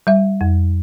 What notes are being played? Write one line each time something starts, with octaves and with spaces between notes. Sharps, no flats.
G3 E5
F2